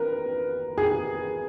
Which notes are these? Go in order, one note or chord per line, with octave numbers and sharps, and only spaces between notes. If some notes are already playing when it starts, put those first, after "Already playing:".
Already playing: A#4 B4
G#4